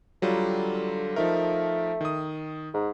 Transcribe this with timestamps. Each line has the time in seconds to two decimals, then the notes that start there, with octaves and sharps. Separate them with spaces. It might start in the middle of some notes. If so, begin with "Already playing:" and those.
0.22 D3 F#3 G3 F4
1.16 F3 A3 D#4 A#4
2.01 D#3 D#6
2.74 G#2